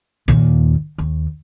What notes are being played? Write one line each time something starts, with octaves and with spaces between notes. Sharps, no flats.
D#2 A#2
D#2